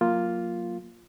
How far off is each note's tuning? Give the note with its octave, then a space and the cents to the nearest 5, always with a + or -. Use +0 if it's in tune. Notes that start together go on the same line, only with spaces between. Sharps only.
F#3 -30 A#3 +0 F4 +0